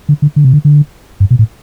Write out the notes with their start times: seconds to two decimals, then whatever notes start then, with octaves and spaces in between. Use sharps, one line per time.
0.09 D3
0.22 D3
0.36 D3
0.44 C3
0.53 D3
0.65 D3
1.20 G2
1.31 B2
1.39 A2